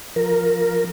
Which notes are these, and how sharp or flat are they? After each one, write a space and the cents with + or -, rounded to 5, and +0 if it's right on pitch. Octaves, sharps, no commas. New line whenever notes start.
F3 +5 A#4 +0